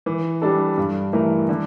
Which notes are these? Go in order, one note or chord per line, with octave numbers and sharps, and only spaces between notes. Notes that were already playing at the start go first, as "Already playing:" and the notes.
E3
G3 D4 A4
G2
E3 A3 E4 A#4
D3